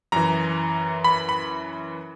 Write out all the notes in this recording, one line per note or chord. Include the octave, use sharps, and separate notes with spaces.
F#2 E3 A#5
B5
B5